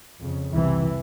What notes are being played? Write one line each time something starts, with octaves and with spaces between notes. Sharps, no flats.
F2 C#3
C2 C3 E3